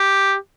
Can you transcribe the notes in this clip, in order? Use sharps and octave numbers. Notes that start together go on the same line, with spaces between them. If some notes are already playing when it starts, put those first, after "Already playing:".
Already playing: G4